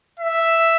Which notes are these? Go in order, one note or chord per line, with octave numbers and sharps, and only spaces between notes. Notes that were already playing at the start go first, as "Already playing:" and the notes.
E5